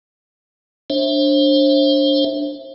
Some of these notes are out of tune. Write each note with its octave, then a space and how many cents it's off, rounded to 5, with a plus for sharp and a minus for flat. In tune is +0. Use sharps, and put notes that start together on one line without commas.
D4 +0 C5 +40 E5 +0